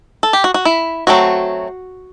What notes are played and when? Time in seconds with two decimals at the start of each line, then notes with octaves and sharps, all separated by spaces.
0.23 A4
0.33 G4
0.44 F#4
0.54 F#4
0.65 E4
1.07 F#3 A3 C4 F#4